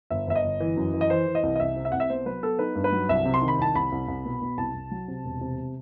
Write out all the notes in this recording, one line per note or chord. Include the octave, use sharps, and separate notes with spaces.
G1 E5
G1 E5
D#5
G1
E3
F#2
E3
D#5
E3 C5
E3
D#5
C2
D#5
C2 E5
C3
E5
C2 F#5
E5
B3 C5
F#3 B4
B3 A4
D#4 B4
G2
B4
F#3
C2 E5
C3
C6
D#3
B5
C2 A5
C2 B5
C2
C2
B2
B2
C2 A5
C2
F#3
C3
E1
C3